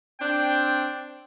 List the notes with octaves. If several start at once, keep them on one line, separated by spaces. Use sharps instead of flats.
C4 D4 G5